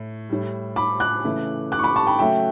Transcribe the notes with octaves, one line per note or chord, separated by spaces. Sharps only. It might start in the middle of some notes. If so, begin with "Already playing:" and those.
Already playing: A2
A2 G3
B5 D6
D6 F#6
C#3 E3 A3
D6 F#6
C#6
B5 D6
A5 C#6
G5 B5
C#3 F#3 A3 E5 G5